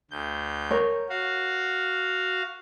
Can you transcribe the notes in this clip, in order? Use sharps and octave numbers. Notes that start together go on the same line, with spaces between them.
D2 G6
A#4 C#5
F#4 F5